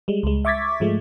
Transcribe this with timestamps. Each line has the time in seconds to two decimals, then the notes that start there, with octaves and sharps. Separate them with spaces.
0.08 G3 G#3
0.23 C#2 G#3
0.45 E5 C#6 D6 G#6 A6 B6
0.80 G#2 F3 G#3 A3